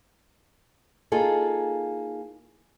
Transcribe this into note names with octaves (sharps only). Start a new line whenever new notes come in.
A#3 D#4 F4 G#4 A4